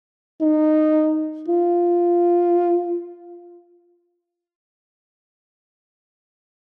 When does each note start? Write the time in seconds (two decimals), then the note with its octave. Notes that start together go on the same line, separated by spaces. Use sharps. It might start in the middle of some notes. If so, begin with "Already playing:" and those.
0.41 D#4
1.48 F4